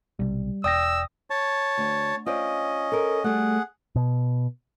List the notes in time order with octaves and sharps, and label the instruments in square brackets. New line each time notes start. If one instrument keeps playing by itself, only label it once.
[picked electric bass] B1 C3 [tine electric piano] G3
[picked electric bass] E1 [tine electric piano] D5 G5 A#6 [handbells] D#6 [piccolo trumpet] E6
[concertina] C#5 A5
[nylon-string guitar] D2
[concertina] C#4 D#5 [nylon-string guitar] F4 C5 D5
[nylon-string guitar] A4 A#4
[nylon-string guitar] G3 A3 [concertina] G#4 F#5
[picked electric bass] B2